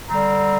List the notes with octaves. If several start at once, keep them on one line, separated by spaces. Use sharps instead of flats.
D3 G3 C4 A#5